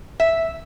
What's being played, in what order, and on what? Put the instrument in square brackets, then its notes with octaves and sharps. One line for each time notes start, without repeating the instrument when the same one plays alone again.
[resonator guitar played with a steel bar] E5